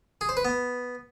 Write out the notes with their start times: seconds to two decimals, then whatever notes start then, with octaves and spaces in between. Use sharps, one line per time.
0.21 G#4
0.29 C5
0.37 B4
0.45 B3